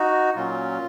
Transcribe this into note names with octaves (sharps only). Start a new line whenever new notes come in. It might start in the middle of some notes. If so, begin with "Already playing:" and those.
Already playing: D#4 F#4
A#2 F#3 C#4 F4